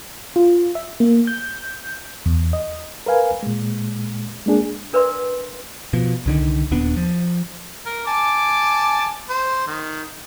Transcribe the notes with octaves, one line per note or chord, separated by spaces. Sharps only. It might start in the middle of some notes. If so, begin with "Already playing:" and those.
F4
E5
A#3
G6
E2
D#5
A#4 B4 F5 G#5
A#2 G#3
G#3 A#3 D4 G#4
D4 A#4 B4 D5 E5 C6
B2 F3
C2 D3 D#3
D#1 D#2 B3 D4
F3
A#4
G#5 A5 D6
C5
D#3